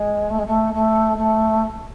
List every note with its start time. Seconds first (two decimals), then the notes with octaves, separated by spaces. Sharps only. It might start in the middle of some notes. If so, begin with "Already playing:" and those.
Already playing: G#3
0.30 A3
0.38 G#3
0.46 A3
0.73 A3
1.17 A3